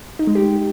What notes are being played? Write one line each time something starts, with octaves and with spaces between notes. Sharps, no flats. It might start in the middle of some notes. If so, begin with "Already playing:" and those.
D#4
G#3
G4